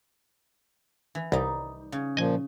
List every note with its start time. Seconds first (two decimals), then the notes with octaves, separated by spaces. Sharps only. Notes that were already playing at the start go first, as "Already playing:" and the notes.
1.15 E3
1.32 C2 G3 D#4
1.92 C#3
2.17 A#2 F3 D#5 G#5